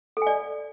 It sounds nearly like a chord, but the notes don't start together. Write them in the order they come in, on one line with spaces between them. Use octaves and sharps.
A4 G#5 D5